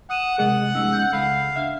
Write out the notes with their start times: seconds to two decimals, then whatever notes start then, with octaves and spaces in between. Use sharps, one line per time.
0.10 F#5 D#6 D#7 E7
0.38 C3 G#3 G#4 A#4 D#5 F#5
0.75 G#3 C#4 D#4 E6
0.93 G6
1.13 C#2 A4 F5 F#5 B5
1.56 D4 E5 F6